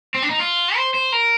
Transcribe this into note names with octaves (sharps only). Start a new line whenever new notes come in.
C4
D4
D#4
F4
C5
C5
A#4